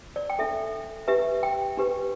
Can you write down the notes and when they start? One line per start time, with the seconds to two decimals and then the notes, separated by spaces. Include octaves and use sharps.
0.16 D5
0.30 G5
0.39 D4 A4 E5
1.08 D4 G4 B4 E5
1.43 G5
1.77 D4 G4 B4